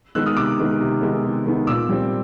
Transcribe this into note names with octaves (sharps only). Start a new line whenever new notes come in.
D#3 G#3 B3 E6 F#6
D#6 F6
C3 D6 E6
D#3 G#3 B3
C3
D#3 G#3 B3
C3
D#3 G#3 B3
A#2 D6 E6
G3 C4